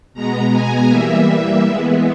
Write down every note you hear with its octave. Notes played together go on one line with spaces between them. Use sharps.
B2 G#3 B3 A#5
G#5
E3 G3 A#3 E5
E3 G#3 B3